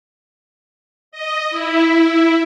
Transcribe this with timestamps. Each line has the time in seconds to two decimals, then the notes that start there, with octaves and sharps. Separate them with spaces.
1.12 D#5
1.50 E4